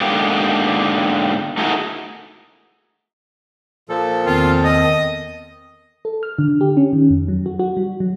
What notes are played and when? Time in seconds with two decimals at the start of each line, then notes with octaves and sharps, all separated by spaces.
0.01 G#2 D3 G#3 A#3 B3 G4
1.58 A3 D#4 E4 F#4 G#4 A#4
3.89 A#2 F3 A4
4.26 E2 D#3 C4 F4
4.64 D#5
6.05 A4
6.23 F6
6.39 D3
6.61 G4
6.77 C#4
6.93 D#3
7.10 F2
7.28 F#3
7.46 F#4
7.59 F#4
7.77 G3
8.00 F#3